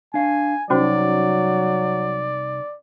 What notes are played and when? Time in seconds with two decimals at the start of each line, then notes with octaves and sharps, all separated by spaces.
0.14 D4 F5 G#5
0.70 C2 F#3 C#4 D#4 F#4 C5 D5